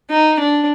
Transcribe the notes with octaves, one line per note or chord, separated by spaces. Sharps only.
D#4
D4